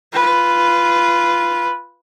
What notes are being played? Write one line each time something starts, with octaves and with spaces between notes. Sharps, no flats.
F4 B4